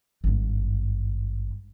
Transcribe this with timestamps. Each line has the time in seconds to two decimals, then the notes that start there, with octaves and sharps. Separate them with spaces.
0.24 G#1 G2